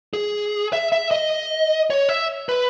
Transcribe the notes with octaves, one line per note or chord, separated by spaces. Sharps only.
G#4
E5
E5
D#5
C#5
E5
B4